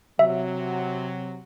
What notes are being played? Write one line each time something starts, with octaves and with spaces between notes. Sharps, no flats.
C3 F#3 E5